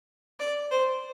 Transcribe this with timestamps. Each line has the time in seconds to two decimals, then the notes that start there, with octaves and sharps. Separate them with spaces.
0.40 D5
0.71 C5